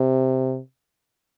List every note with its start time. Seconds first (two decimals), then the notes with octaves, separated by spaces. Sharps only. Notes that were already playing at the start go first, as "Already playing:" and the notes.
Already playing: C3